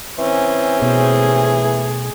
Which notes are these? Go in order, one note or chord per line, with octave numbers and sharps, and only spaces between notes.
E3 C4 C#4
B2 A3 G#4